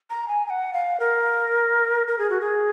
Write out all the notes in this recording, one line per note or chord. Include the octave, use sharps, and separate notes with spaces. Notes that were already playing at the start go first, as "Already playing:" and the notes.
A#5
G#5
G#5
F#5
F5
A#4
A#4
G#4
F#4
G#4